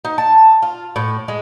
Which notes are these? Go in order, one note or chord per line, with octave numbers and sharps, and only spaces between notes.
D#4
A5
F4
A2
G#3